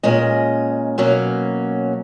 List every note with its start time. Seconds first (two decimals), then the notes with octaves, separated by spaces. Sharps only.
0.03 A#2 G#3 C#4 D#5
0.98 B2 F#3 A#3 C#4